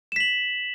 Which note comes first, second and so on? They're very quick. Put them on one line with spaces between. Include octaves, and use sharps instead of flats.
E7 B6 F#7